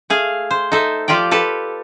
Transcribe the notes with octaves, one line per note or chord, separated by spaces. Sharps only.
A3 G#4 F5
C5
D#4 A4 C5 E5
F3 F4 G4 D5 G5
G4 A4 B4 A5